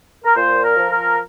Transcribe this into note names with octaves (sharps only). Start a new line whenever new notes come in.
A#4
A#2 C5
A#4
F3
A#4